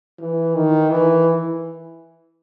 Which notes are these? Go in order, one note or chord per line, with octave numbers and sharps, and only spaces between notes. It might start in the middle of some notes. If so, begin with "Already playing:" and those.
E3
D#3
E3